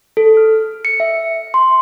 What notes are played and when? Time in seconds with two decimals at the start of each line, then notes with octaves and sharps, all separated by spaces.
0.17 A4
0.37 F6
0.85 C#7
1.00 E5
1.54 C6